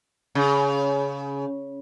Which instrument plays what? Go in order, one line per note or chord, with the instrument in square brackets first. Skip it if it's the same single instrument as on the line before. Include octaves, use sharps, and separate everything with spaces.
[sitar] C#3